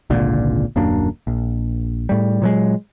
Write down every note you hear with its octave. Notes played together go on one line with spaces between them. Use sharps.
G#1 C#2 A#2 D3
D#1 F#2 A#3 D4
A#1
A2 G3
A#2 F#3 G#3